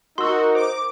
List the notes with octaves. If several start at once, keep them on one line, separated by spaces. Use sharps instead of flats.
D#4 F#4 A#4 C6 E6
C5 D6